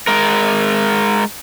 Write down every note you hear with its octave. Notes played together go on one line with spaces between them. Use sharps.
G#3 A#4